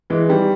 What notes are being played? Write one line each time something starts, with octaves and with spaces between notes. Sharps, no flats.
E3 G#3
D#3 G3